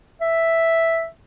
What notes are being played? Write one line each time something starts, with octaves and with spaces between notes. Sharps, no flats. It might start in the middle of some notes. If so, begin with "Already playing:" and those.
E5